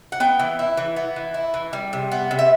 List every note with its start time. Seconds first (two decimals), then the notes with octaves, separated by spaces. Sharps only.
0.12 F#5
0.20 B3 G5
0.39 E3
0.59 E4
0.77 E3
0.96 B3
1.16 E3
1.34 E4
1.54 E3
1.73 G3
1.93 C3
2.12 B3
2.31 C3
2.39 E5